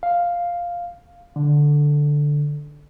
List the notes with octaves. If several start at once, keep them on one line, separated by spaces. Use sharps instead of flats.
F5
D3